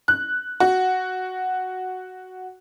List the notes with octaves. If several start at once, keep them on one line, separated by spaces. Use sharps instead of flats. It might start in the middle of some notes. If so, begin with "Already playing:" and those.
F#6
F#4